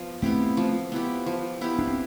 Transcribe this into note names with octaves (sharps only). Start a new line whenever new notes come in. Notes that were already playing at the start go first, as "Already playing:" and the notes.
Already playing: F3 B3
A3 B3 C4 E4 G4
F3
B3 E4 G4
F3
B3 E4 G4
D4
C4